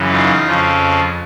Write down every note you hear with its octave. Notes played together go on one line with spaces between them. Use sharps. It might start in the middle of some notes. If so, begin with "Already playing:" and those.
Already playing: F#2 C#3 E3
D#4 F4
F2 C#3 F3